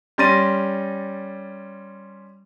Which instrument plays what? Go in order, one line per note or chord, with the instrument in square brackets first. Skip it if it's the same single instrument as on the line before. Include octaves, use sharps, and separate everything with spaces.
[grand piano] G3 C#4 C6 A6 A#6 D#7